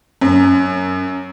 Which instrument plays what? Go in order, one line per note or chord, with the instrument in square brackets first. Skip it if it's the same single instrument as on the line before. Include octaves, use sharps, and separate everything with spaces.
[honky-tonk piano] F#2